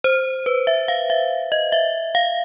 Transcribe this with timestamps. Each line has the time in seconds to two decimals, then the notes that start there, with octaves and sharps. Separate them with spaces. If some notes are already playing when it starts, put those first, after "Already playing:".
0.04 C5
0.46 B4
0.67 E5
0.88 F5
1.10 E5
1.52 D#5
1.72 E5
2.15 F5